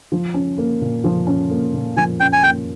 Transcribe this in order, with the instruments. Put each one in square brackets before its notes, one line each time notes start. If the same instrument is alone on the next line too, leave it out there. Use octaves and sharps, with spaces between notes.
[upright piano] F3
C#4
A#3
A#2
F3
C#4
A#3
A#2
[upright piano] F3 [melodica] G#5
[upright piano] C#4 [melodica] G5
[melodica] G#5
[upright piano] A#3 [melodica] G5